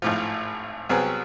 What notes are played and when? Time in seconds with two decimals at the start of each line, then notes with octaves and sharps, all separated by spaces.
0.02 G#1 A2 F3
0.89 C2 F#3 B3 C4 G#4